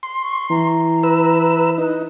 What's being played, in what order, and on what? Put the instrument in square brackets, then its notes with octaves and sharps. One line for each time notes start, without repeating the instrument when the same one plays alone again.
[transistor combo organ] C6
[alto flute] C#6
[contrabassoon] E3 [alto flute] A#5
[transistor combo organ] B4 E6
[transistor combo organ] D#4 [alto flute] B4